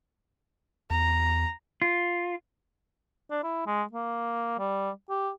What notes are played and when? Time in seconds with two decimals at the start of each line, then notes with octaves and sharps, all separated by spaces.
0.90 E2 A#5
1.82 F4
3.31 D4
3.44 E4
3.67 G#3
3.93 A#3
4.59 G3
5.10 G4